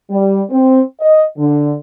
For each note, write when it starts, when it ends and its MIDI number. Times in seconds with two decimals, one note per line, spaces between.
0.10 0.42 55
0.50 0.80 60
1.00 1.23 75
1.37 1.74 50